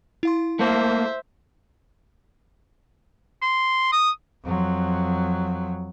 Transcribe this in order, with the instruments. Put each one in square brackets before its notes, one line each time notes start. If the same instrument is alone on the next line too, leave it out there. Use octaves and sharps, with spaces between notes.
[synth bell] E4 F5 C6
[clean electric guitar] A3 A#3 [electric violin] C5 E5
[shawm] C6
D#6
[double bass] F2 F#3